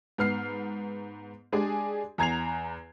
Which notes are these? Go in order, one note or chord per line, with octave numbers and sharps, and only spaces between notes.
G#2 B3 F6 C7
G#3 D4 G4 G#4 D5 G#5
E2 A#5 G#6 C7 F7